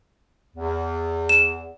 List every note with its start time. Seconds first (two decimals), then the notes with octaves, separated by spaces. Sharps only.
0.56 E2
1.29 E7